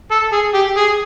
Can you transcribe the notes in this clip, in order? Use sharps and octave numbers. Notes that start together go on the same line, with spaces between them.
A4
G#4
G4
G#4